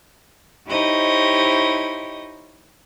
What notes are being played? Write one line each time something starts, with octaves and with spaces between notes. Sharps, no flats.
D#4 E4 G4 C5 C#5 D#5